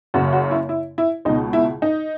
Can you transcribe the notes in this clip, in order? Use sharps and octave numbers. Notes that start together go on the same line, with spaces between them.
F#1 F#2 C#3 F#4
F#4
E4
E4
E4
C#2 B2 D#4
E4
D#4